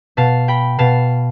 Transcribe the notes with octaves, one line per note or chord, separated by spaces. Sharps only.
B2 F5 A5
G5 B5
B2 F5 A5